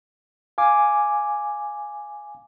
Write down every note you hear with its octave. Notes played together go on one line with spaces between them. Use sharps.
F5 G#5 D6